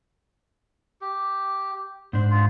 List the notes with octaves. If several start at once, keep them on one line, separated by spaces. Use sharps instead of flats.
G4
G#2 D4 C5
F4